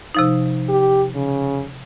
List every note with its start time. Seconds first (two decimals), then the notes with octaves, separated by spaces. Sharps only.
0.15 C3 F3 D#4
0.69 G4
1.16 C#3